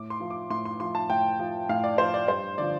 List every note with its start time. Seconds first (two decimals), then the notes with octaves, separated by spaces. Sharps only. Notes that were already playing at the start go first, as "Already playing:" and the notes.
Already playing: A2 D6
0.10 C6
0.20 F3
0.30 D6
0.50 A2 C6
0.65 C6
0.80 F3 C6
0.95 A5
1.10 A2 G5
1.39 F3
1.69 A2 F5
1.84 D5
1.98 F3 C5
2.14 D5
2.28 G2 C5
2.58 D3 F3 D5